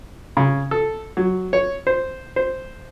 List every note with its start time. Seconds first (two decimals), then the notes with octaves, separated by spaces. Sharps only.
0.37 C#3
0.71 A4
1.17 F#3
1.53 C#5
1.87 C5
2.36 C5